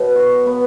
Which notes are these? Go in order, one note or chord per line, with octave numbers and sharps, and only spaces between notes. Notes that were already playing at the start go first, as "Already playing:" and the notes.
Already playing: B2 F#3 B3
F#4
B3